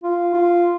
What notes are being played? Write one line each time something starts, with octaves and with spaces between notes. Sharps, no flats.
F4
F4